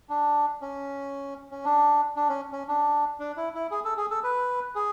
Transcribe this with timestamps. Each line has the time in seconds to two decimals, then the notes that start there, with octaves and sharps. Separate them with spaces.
0.09 D4
0.62 C#4
1.51 C#4
1.65 D4
2.16 D4
2.29 C#4
2.52 C#4
2.68 D4
3.20 D4
3.37 E4
3.55 E4
3.71 G#4
3.85 A4
3.97 G#4
4.11 A4
4.23 B4
4.75 G#4